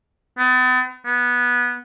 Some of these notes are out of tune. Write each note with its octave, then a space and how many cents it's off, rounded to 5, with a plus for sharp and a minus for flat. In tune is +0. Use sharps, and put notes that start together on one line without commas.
B3 +40
B3 -15